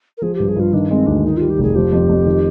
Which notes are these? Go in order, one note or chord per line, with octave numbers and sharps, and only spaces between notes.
A#4
F3 G#4
G4
G2
G#4
G2 F4
D#3 D4
G#3 C4
D2 D4
D#3 D#4
G3 F4
G4
F1 G#4
F3 G4
F2
F2
D#3